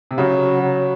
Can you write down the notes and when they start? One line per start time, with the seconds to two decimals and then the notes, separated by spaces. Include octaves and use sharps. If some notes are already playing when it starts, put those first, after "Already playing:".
0.11 C3
0.18 C#3 F#3
0.62 F#3